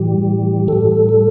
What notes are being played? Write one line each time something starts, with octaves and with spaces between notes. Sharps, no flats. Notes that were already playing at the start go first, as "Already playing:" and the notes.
Already playing: A2 E3 G3 G4
A2 G3 A4
A4